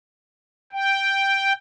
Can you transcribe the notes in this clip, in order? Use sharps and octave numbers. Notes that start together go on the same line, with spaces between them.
G5